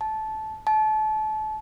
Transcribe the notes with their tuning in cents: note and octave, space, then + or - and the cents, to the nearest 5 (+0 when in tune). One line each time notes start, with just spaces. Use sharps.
A5 -15
A5 -30